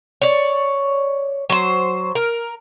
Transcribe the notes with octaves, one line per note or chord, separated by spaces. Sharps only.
C#5 D5
F#3 C5
A#4